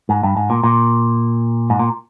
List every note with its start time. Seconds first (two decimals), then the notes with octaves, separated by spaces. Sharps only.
0.09 G#2
0.23 G2
0.37 G#2
0.50 A#2
0.64 A#2
1.70 G#2
1.79 A#2